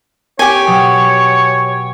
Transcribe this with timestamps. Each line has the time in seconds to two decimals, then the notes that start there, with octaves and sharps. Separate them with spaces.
0.39 G4 C#5 G5 G#5
0.67 B2 F#3 D#6